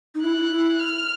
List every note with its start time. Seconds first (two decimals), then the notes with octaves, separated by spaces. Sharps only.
0.15 D#4
0.22 E4 F#6
0.37 E4
0.51 E4
0.80 F6